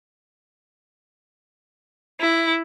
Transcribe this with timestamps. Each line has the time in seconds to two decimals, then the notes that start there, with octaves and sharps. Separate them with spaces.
2.20 E4